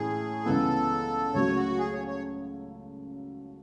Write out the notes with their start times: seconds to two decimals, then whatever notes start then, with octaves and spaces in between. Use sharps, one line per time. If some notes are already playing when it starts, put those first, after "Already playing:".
Already playing: A2 E3 A3 C#4 G#4
0.45 C#2 C#3 E3 B3 A4
1.34 C#2 C#3 F#3 A3 C#5
1.56 F#4
1.78 G#4
1.93 C#5
2.07 C#5